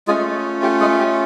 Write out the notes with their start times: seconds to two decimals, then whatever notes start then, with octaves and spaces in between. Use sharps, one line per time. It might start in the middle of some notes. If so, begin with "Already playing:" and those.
0.08 G#3 A3 C#4 F4 G#4
0.62 G4
0.81 G#3 G#4
0.99 G4